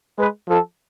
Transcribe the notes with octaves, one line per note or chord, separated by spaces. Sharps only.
G#3 B4
F3 A4